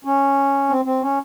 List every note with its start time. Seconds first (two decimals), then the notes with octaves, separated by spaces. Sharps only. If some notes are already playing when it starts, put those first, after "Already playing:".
0.05 C#4
0.69 C4
0.85 C4
1.02 C#4